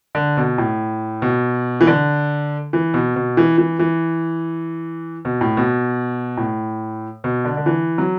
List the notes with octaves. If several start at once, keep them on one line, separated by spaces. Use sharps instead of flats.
D3
B2
A2
B2
E3
D3
E3
B2
B2
E3
E3
E3
B2
A2
B2
A2
B2
D3
D3
E3
F#3